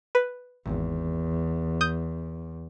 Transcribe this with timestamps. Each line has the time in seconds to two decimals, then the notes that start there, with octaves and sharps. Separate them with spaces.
0.15 B4
0.66 G#1 E2
1.81 D#6 G6